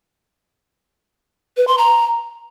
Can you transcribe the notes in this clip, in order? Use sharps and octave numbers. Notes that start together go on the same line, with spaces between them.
B4
C6
A#5